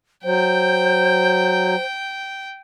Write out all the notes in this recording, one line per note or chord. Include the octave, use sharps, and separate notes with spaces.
F#3 C5 G5